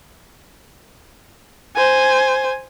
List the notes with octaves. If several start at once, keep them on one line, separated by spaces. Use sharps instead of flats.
C5 G#5